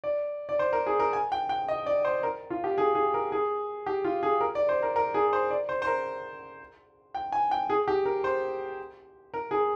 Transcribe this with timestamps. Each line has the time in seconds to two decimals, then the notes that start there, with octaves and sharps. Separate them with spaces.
0.04 D5
0.49 D5
0.59 C5
0.73 A#4
0.86 G#4
1.00 A#4
1.13 G#5
1.32 G5
1.49 G5
1.68 D#5
1.86 D5
2.05 C5
2.23 A#4
2.50 F4
2.64 G4
2.78 G#4
2.95 G#4
3.14 A#4
3.32 G#4
3.86 G4
4.04 F4
4.23 G#4
4.41 A#4
4.55 D5
4.69 C5
4.83 A#4
4.96 A#4
5.14 G#4
5.33 C5
5.51 D5
5.69 C5
5.82 C5
5.87 A#4
7.15 G5
7.32 G#5
7.51 G5
7.70 G#4
7.88 G4
8.05 A#4
8.24 C5
9.34 A#4
9.51 G#4